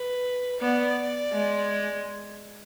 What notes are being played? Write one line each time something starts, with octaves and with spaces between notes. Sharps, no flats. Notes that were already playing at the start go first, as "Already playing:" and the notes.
Already playing: B4
B3 D5
G#3